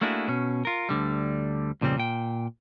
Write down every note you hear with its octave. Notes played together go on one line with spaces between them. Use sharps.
A3 A#3 D4 E4 F#4 G#4
B2 C#4
F4 A#4
D2 D3 G3
F2 A#2 C#3 G3 C4
A#2 G5